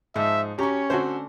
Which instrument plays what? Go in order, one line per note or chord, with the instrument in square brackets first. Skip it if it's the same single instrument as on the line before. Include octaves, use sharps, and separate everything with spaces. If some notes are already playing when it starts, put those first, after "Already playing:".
[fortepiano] G#2 [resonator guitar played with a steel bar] F3 D#4 C5 [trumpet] E5
[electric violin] C#4 [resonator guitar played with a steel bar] F#4 A#5 [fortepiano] G4 [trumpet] C#5
[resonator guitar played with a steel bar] D3 A3 C4 [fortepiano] F#4 C5